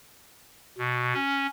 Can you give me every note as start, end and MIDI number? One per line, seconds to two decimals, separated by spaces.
0.78 1.14 47
1.14 1.47 61